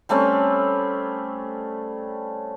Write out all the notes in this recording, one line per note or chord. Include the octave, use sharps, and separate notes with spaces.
G3 A3 C4 C#4